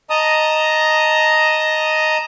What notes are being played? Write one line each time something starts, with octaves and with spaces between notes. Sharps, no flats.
D#5 A5 A#5 D#6